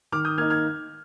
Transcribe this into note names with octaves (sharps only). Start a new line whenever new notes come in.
D#3 D6 F6
D#6 G6
A#3 D#4 F6 G#6
F6 G#6